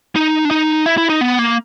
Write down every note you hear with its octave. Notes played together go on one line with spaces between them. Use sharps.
D#4
D4
D#4
E4
E4
D#4
B3
A#3